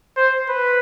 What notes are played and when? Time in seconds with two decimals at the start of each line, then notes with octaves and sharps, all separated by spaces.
0.17 C5
0.49 B4